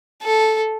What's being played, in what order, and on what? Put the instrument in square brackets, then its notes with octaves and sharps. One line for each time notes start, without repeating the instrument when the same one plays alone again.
[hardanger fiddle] A4